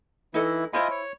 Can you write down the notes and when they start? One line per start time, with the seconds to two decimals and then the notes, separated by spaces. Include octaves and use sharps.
0.34 E3 D#4 E4 A4 D#5
0.73 E4 F4 C5 D#5 G#5 B5
0.90 C#5